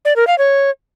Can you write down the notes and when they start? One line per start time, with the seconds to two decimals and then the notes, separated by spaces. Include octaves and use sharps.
0.05 D5
0.16 A#4
0.27 F5
0.38 C#5